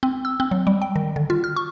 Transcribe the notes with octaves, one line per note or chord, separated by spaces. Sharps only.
C4
E6
C4
F#3
G3
G5
D#3
D3
F4
F6
C#6